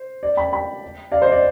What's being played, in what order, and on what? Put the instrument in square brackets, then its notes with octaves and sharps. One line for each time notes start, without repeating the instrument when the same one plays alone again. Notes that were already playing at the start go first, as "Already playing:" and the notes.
Already playing: [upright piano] C5
D5
G5 B5
G5 B5
D5 F5
C5 D#5
D5